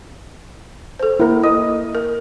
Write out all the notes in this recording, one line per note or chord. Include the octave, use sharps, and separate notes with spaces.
A4 C5
A#3 E4 A#4
D#5 D#6
A#4